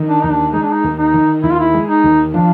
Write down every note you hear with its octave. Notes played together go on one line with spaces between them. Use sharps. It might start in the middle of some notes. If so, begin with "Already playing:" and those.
Already playing: D#3
D4
D#2 D#4
D4
G#3 D#4
D4
D#4
D#2
D#4
D#3
D#2 E4
F4
E4
G#3
D#4
D#2
F3 D4